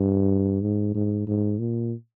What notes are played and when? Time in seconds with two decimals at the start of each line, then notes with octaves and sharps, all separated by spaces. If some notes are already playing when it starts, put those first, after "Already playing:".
Already playing: G2
0.62 G#2
0.94 G#2
1.27 G#2
1.59 A#2